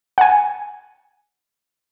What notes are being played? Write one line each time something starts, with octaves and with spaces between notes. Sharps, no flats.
F#5 G#5